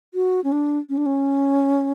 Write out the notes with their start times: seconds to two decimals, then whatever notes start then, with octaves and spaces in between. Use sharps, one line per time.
0.14 F#4
0.44 C#4
0.52 D4
0.89 C#4
0.97 D4
1.06 C#4